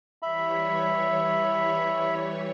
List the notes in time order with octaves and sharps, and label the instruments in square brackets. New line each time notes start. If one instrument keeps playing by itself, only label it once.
[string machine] E3 G3 C#5 [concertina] E5 B5